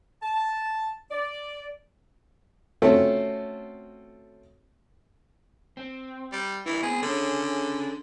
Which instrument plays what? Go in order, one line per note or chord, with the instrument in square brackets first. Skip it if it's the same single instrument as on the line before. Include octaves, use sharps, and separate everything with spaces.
[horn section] A5
D5
[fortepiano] A3 C4 C#4 F4 F#4 A4
[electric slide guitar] C4
[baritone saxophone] G3
[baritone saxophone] E3 [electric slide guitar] E4 A#4
[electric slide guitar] B3 C4 [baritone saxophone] G#4
[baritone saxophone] D3 [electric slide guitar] C#4 G#4 C#5